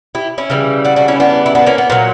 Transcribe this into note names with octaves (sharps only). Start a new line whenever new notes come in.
E4 G4
C#4 E4
C#3 E3 G3
D4 F#4
D4 F#4
C#4 E4
B3 D4
E4
B3 D4
A#3 C#4
B3
A#2 F#3 A#3